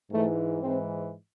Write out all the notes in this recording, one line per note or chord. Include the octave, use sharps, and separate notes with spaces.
G#2 E3 A3
G#2 E3 C4